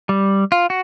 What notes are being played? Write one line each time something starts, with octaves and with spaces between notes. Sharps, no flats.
G3
F4
F#4